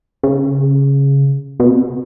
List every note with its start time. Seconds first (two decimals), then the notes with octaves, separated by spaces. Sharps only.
0.23 C#3
1.60 B2
1.68 C3